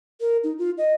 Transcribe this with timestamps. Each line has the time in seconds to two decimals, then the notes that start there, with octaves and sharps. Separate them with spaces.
0.21 A#4
0.44 D#4
0.58 F4
0.78 D#5